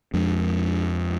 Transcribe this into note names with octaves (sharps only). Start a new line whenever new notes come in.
F2 F3 G#3 D4